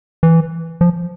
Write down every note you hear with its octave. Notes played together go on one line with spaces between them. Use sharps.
E3
F3